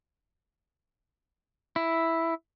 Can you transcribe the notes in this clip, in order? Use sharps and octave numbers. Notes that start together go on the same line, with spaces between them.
E4